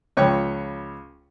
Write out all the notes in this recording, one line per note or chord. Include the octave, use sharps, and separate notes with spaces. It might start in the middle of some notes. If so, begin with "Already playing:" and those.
C#2 F3 B4 C#5 G5 C#6